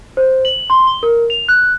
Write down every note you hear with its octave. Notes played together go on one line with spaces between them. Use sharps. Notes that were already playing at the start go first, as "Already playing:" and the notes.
C5
F#7
C6
G7
A#4
F7
F#6